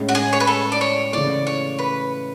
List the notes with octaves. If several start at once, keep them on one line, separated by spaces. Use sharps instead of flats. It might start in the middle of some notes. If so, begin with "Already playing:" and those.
Already playing: A2 G#3 C#4 E4
F#4
G#4
C#5
B4
A4
D5
C#5
C#3 E3 A3 D5
C#5
B4